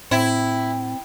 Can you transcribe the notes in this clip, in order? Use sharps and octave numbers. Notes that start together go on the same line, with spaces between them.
A2 C4 E4 G5